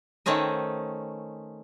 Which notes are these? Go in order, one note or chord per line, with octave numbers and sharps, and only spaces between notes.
D#3 A3 C4 C#4 D#5